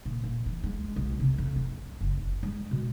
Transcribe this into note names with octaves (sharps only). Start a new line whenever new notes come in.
A#2
A#2
E3
G#3
B1
C3
F2
D4
F#1
D4
G#3
B2